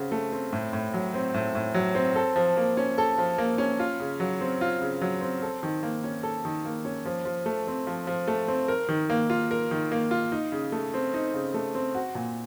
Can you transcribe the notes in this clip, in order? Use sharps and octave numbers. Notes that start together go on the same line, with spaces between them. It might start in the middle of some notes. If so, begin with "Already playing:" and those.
Already playing: C#3 C4 F#4
A3
C4
A2
A2
F#3
C4
A2
A2
F#3
C4
A4
F3
A#3
C#4
A4
F3
A#3
C#4
F4
C#3
F#3
C4
F4
C#3
F#3
C4
A4
D#3
A#3
C#4
A4
D#3
A#3
C#4
F3
F3
A3
C4
F3
F3
A3
C4
A#4
D#3
A#3
F4
A#4
D#3
A#3
F4
D#4
C#3
A3
C4
D#4
C#3
A3
C4
F#4
A#2